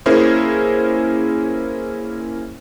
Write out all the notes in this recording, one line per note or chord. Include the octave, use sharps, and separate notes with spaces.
A#3 C#4 E4 G#4 A#4 C5